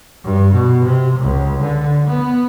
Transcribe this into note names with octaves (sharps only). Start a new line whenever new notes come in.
G2
B2
C3
C#2
D3
B3